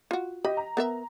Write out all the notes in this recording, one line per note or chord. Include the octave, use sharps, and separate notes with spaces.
F4 F#4
G4 D#5 B5
A#5
B3 A#4 E5